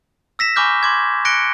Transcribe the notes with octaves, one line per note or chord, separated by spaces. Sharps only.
E6 A#6 B6 E7
G#5 B5 C#6 D6 F6 G6
C6 D6 G#6
F#6 A#6 C#7 D7 G7